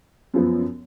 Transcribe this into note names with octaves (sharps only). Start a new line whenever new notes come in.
F#2 F3 B3